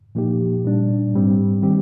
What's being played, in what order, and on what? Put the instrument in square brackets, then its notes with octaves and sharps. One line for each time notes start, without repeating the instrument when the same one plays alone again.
[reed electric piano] A#2 F3 A#3 D#4 G4
A#2 G3 D4
G#2 G3 C4
D#3 G3 C4 G4